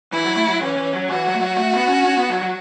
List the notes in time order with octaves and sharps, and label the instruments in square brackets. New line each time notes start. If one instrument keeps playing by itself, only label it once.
[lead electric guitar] E3 [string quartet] E4
[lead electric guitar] F#3
A3
F#3
[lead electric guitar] E3 [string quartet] C#4
[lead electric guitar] E3
F#3
[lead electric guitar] E3 [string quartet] F#4
[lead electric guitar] F#3
A3
F#3
A3
B3
C#4
C#4
B3
F#3
F#3